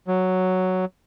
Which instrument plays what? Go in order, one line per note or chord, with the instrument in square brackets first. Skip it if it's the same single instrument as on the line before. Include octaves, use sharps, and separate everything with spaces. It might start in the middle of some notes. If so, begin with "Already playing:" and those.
[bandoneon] F#3